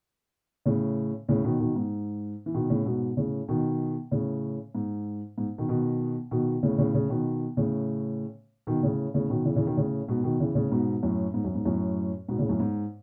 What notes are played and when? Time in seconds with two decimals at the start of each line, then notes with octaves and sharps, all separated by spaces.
0.66 A2 C#3
1.29 A2 C#3
1.44 B2 D#3
1.60 B2 D#3
1.76 G#2
2.46 E3
2.54 B2 D#3
2.70 A2 C#3
2.86 G#2 B2
3.17 A2 C#3
3.48 B2 D#3
4.11 A2 C#3
4.75 G#2
5.38 G#2
5.58 B2 D#3
5.69 B2 D#3
6.31 B2 D#3
6.63 A2 C#3
6.78 A2 C#3
6.94 A2 C#3
7.10 B2 D#3
7.57 A2 C#3
8.67 B2 D#3
8.83 A2 C#3
9.14 A2 C#3
9.30 B2 D#3
9.45 C#3 E3
9.56 C#3 E3
9.66 B2 D#3
9.77 A2 C#3
10.08 G#2 B2
10.24 B2 D#3
10.40 C#3 E3
10.55 A2 C#3
10.72 G#2 B2
11.03 F#2 A2
11.34 G#2
11.44 F#2
11.55 G#2
11.65 F#2 A2
12.28 G#2 B2
12.39 A2 C#3
12.49 F#2 A2
12.60 G#2